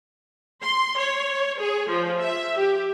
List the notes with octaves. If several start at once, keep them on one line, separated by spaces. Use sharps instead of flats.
C6
C#5
G#4
F3
E5
G4